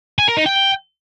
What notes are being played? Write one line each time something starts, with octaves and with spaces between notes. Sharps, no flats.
G#5
A#4
D#4
G5